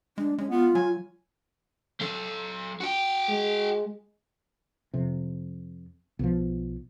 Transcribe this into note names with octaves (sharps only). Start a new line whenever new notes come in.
G#3 D4
G#3 C#4
B3 F4
F#3 G#5
F#3 A4
F#4 G5
G#3
F2 C3
B1 B2 F3